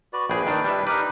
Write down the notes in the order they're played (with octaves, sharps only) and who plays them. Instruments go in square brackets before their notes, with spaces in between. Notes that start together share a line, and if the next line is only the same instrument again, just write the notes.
[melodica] F#4 B4 D5
[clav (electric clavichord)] A#1 G#4 [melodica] B4 G5
[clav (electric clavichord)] D#3 D4
G3 D4 E4
[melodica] D4 G4 A#4 [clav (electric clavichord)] D#4 B4